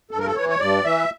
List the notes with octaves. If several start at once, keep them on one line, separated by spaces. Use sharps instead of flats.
G2 A4
A#4
A4
E3 C#5
C#5
G2 D5
E3 E5